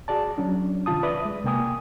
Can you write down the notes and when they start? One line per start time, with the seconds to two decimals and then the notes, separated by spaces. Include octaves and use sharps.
0.08 F#4 G#4 D5 A5
0.38 F#3 C#4 D4
0.86 C2 D#3 F4 A5 D#6
1.03 B4 D5 E5 D#6
1.25 G#3
1.44 C2 C3 A#3 G5 G#5 D#6